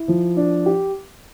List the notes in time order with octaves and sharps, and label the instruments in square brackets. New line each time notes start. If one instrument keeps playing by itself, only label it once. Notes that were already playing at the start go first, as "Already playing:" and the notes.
Already playing: [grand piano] E4
F3
D4
G4